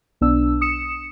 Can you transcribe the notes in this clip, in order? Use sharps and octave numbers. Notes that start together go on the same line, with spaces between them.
B1 B3 D4 E6
D#6 C#7 E7